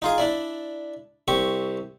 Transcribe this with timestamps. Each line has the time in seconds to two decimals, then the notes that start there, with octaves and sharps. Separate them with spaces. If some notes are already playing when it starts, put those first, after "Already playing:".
0.02 D#4 F4 G#4
0.18 D4 E4 D5
1.28 C2 C4 G4 C#6